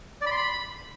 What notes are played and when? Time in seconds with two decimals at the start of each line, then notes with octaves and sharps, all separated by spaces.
0.21 D5
0.26 B5
0.31 C6
0.37 B5